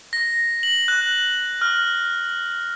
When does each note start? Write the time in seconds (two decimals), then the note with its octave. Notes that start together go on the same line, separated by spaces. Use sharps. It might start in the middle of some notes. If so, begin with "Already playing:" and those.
0.13 A#6
0.63 F#7
0.88 F#6
1.61 F6